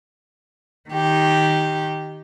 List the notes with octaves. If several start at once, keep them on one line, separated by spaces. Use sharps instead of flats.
D#3 G4